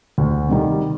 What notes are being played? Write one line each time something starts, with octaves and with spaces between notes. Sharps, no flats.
D2
C3 D#3 G3